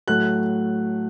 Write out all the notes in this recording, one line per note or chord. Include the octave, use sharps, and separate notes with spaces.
A2 F#3 A3 F#6